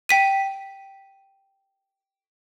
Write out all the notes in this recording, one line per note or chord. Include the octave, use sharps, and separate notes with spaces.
G5 B6 D#7